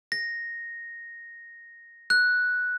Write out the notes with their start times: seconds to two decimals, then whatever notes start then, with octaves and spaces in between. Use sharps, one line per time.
0.12 A#6
2.10 F#6